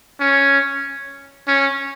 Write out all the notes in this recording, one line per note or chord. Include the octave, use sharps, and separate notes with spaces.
C#4
C#4